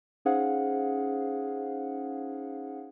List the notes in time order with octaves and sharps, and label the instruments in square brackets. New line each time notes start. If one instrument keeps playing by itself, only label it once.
[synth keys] C#4 D#4 G#4 C5 F5 F#5